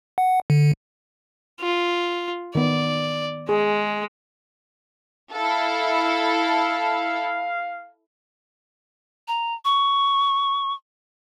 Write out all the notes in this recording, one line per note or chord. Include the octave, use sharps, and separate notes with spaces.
F#5
D3
F4
D#3 B3 D5
G#3 G#4
E4 A4 F5
A#5
C#6